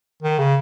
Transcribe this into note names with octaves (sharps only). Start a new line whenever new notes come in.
D#3
C#3